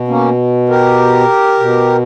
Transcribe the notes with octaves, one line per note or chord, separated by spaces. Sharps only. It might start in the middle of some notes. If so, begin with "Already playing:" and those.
Already playing: B2
A#3 C#4
G4 A#4
B2